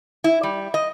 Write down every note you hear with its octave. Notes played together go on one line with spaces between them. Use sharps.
E4
G3
D#5